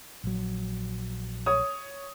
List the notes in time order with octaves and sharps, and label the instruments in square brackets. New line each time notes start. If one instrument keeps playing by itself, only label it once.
[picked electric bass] A#1 F#3
[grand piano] C#5 D#6